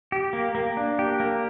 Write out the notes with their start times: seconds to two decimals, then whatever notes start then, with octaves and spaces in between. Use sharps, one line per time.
0.12 G4
0.33 A#3
0.55 A#3
0.77 D4
0.99 G4
1.20 A#3